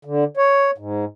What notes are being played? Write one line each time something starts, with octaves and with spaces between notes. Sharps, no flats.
D3
C#5
G#2